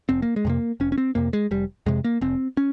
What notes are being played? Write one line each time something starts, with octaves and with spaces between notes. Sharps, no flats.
F1 C4
A#3
G#3
F2 C3 A#3
F1 C#4
C#4
C4
F2 C3 A#3
G#3
F1 G3
F2 C3 G#3
A#3
F1 C4
C#4